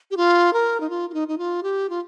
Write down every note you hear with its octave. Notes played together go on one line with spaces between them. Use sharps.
G4
F4
A#4
D#4
F4
F4
D#4
D#4
F4
G4
F4